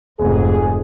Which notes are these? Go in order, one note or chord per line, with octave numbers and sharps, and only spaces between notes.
F1 G#2 G#4